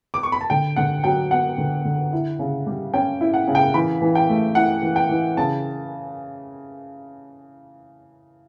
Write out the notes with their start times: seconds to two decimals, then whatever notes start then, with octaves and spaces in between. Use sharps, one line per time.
0.14 D6
0.23 C#6
0.32 B5
0.41 A5
0.50 D3 G5
0.76 D3 F#5
1.04 F#3 G5
1.31 B3 F#5
1.58 D3
1.85 D3
2.13 E4
2.39 C#3
2.67 G3
2.94 C#4 G5
3.21 E4
3.34 F#5
3.47 C#3
3.55 G5
3.74 E3 B5
4.01 E3
4.15 G5
4.29 A3
4.55 E4 F#5
4.83 E3
4.96 G5
5.09 E3
5.37 C#3 A5